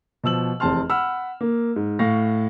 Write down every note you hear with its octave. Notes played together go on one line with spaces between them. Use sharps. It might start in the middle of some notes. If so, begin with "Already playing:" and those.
B2 F3 E6 F#7
F1 E2 C4 A5 C6 F6
F#5 B5 E6 F6
A#3
G#2
A2 F5 C#6 A#6